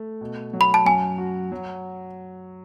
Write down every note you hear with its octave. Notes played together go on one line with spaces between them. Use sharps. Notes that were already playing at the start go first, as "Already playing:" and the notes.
Already playing: A3
B2
F#3
B5
A5
F#2 G#5
F#4
F#3